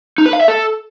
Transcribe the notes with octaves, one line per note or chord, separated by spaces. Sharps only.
D#4
B4
F5
E5
A4